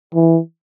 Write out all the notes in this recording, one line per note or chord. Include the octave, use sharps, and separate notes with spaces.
E3